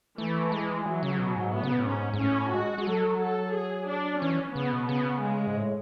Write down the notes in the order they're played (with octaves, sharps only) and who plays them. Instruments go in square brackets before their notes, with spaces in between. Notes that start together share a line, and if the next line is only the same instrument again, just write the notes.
[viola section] E3 [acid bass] A3
[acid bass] G#3
[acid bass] E3 [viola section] F#3
[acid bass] C#3
B2
G#2
[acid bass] A2 [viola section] B3
[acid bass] C#3
B2
A2
[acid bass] G#2 [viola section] C#4
[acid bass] G#2
[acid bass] A2 [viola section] C#4
[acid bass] G#3 [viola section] F#4
[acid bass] G#3
[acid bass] F#3 [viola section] A4
[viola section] A4
G#4
D4
[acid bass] E3 [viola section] C#4
[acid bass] C#3 [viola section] B3
[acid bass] B2
[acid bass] C#3 [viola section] B3
[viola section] G#3
[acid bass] G#2
A2